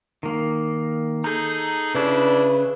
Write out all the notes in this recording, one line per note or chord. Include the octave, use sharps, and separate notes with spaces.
D#3 A#3
D#4 G#4 A4 A#5 G6
C#3 D4 E4 B4 D5